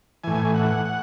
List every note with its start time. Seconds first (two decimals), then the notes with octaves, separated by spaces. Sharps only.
0.24 A2 E3 G#5
0.55 F#5
0.85 F#5